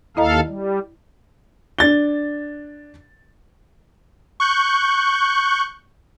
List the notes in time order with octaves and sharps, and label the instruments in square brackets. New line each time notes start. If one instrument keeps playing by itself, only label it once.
[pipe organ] D#2 A4 F5 [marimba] E4 D#5 A#5
[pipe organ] G3
[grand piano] D4 A6 G7
[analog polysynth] C#6 F#6 G6